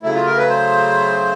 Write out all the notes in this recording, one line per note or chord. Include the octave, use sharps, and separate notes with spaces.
C#3 F#3 A3 E4
F4
A#4
B4
C5